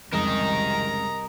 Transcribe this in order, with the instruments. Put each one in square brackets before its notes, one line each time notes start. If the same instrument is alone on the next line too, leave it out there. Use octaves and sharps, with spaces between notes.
[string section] C2 [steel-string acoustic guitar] F2 C#3 G#3 [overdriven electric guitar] A#4 D#5 [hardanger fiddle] A#5